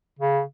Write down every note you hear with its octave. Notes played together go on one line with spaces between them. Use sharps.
C#3